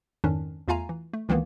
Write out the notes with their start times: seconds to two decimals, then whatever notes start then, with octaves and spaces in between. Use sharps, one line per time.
0.24 F2 G#2 D#3 C#4 D4
0.68 E2 A3 F4 F5 G#5 A#5
0.89 E3
1.13 A3
1.29 C#2 D#3 E3 A#3 B3